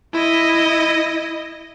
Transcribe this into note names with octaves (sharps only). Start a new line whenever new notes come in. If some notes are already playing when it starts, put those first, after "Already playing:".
E4 D#5